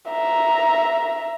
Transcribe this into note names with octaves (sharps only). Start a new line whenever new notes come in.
E5 A#5